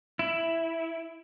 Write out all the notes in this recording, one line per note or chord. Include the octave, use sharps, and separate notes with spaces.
E4